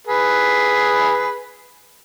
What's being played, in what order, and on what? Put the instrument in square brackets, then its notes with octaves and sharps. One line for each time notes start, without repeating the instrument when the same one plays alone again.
[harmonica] G#4 B4